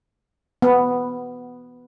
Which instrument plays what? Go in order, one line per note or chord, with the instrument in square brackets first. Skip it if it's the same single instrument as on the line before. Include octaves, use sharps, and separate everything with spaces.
[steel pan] B3